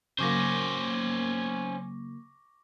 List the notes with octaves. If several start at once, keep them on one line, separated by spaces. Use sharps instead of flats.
C#3 F#3 A#3 C#4 C5 C#6 D6 A#6